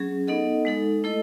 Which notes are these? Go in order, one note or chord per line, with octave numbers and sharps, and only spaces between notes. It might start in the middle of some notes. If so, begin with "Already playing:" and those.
Already playing: F#3 C#4 G#4
B3 D#4 A4 D#5 F#5
G#3 D#4 A4
A3 E4 A4 D#5